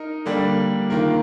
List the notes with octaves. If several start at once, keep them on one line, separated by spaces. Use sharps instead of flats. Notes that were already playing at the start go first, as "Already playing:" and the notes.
Already playing: D#4 A#4
D3 G3 A#3 D4
D#3 A#3 F4 A#4